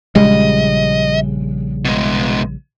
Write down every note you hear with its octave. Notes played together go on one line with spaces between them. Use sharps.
A#1 C#3 G3 G#3 D#5
B2 G#3